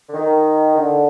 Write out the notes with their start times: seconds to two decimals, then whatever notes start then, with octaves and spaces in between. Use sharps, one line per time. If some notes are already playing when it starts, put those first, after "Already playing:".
0.09 D3
0.14 D#3
0.76 D3